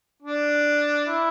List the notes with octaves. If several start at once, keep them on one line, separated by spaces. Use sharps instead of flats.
D4
E4